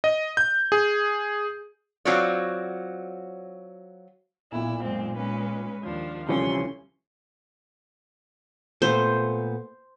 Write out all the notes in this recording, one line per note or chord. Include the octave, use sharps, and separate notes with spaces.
D#5
G6
G#4
F#3 C4 F4 F#4 C#5 D5
B1 A#2 E4
F#2 G#3 C4
G#3 C#4 B4
D#2 F3 D4
D2 C3 E3 F3 G3 C#4 C6
A#2 A3 B3 C5